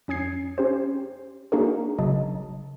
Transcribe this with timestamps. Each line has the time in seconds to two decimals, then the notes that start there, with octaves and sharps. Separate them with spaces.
0.08 F2 C#4 D#6 G#6 C7
0.58 C#4 G4 C5
1.52 A#3 D4 D#4 F#4 G#4 A#4
1.99 G#1 C#3 F#3 D#5 A5